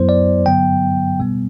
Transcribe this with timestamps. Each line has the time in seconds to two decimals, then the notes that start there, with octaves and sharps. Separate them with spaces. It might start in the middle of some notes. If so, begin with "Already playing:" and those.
Already playing: F#2 F#3 B3 E4 C5
0.09 D5
0.46 G2 D3 F#3 B3 G5
1.20 B2 G3 B3